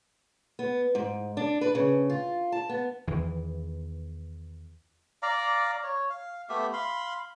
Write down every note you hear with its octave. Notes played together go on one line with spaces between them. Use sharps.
B3
G#2
D4
B4
C#3
F4
A5
B3
E2 D#3 E3
D5 F5 A#5
C#5
F5
A3 B3 G4 E5
F5 B5 C6